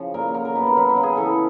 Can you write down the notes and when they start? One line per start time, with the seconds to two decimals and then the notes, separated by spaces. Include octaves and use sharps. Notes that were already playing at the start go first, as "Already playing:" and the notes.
Already playing: C#3 F3
0.14 A#2 A#4
0.34 F#3 A#4
0.45 A#4
0.55 B2 B4
0.66 A#4
0.77 F#3 B4
0.90 A#4
0.96 C#3
1.03 G#4
1.17 E3 A4